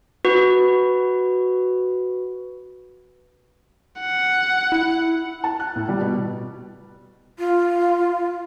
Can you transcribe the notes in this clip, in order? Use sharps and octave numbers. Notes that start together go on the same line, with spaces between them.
F#4 B4
F#5
E4
A5
F#6
A2
G3
B2
F4